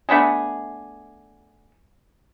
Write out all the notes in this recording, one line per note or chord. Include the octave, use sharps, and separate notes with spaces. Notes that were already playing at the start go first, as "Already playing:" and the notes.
A3 B3 D4 G#4